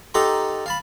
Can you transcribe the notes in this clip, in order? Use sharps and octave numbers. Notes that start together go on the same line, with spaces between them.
D#4 G4 A4 F#5 A#5 C6
F5 A5 B5